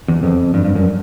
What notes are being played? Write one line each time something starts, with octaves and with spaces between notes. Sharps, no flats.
E2
F2
G2
G2
F#2